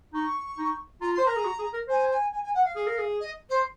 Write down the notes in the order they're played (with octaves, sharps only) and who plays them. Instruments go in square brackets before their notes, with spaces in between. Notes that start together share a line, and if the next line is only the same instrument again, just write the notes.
[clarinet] D#4 [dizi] C#6
[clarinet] D#4
[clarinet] F4 [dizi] A#5
[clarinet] C5 [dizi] C6
[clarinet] A#4 [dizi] A#5
[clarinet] G#4
F#4
G#4
A#4
[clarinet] C5 [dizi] G#5
[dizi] G#5
G#5
G#5
F#5
F5
[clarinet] G#4
A#4
G#4
[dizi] D#5
C5